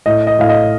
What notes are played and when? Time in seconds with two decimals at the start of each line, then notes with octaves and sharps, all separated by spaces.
0.06 A2 D#5
0.27 D#5
0.39 A2 F5
0.49 D#5